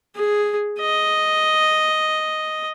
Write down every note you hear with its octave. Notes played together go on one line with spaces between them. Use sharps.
G#4
D#5